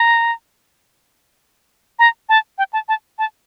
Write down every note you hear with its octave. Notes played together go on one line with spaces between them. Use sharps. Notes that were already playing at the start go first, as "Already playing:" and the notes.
Already playing: A#5
A#5
A5
G5
A5
A5
A5